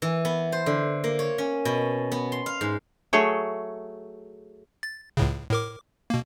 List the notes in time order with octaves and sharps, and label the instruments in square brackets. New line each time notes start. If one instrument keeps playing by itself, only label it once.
[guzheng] E3
B3
C5
D3
A#3
C#5
C#4
B2
B3
C6
F5
G#2
[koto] F#3 A3 G#4 C#5
[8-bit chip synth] A6
C#2 A2 C#3
A2 A#4 D6
B2 A#3